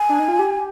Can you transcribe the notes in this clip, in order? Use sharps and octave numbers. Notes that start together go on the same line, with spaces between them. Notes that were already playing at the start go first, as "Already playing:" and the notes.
Already playing: G#5
D4
D#4
F4
G4